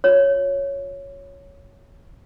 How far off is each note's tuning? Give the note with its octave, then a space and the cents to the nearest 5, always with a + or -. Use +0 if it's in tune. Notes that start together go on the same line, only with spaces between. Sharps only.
F4 +35 C#5 +0